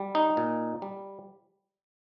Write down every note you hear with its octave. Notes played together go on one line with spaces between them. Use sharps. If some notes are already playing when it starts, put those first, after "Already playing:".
Already playing: G3
D#4
A#2
G3